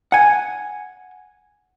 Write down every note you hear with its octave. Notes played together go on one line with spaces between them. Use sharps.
F#5 G#5